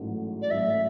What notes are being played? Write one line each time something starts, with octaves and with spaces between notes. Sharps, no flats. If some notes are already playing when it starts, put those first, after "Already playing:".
Already playing: A1 G#2 F#3 A3
D5
A1 G#2 F#3 A3 E5